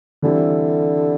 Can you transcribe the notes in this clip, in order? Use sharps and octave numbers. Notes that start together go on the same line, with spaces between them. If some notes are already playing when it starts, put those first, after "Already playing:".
D3 E3 G3 C4 E4